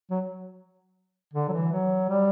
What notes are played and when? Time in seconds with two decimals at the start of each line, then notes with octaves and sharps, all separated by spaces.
0.10 F#3
1.34 D3
1.48 F#3
1.52 E3
1.72 F#3
2.09 G3